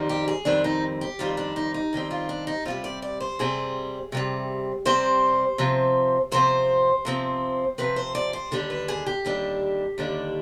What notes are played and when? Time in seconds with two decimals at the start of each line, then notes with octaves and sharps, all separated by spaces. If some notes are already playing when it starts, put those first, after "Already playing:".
Already playing: F2 D#3 G3 C4
0.09 G4
0.28 G#4
0.45 F2 D#3 G3 C4 D4
0.64 D#4
1.01 G4
1.19 F2 D#3 G3 C4 F4
1.37 D4
1.56 D#4
1.74 D#4
1.93 F2 D#3 G3 C4
2.11 F4
2.29 D4
2.47 D#4
2.65 C3 G3 C4 F4
2.84 D5
3.02 D5
3.20 C5
3.39 C3 G3 C4 G#4
4.12 C3 G3 C4
4.85 C3 G3 C4 C5
5.58 C3 F3 C4
6.31 C3 F3 C4 C5
7.05 C3 F3 C4
7.78 C3 F3 C4 B4
7.96 C5
8.15 D5
8.33 C5
8.51 D#2 D3 G3 D4 G4
8.70 B4
8.88 G#4
9.06 G4
9.25 D#2 D3 G3 D4
9.98 D#2 D3 G3 D4